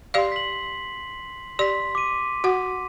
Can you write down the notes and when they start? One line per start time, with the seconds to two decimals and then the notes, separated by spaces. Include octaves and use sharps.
0.14 G4 D5 F5 C6 C7
0.32 B6 F#7
1.59 G4 D5 C6 B6
1.95 D6 D#7
2.44 F#4 F#5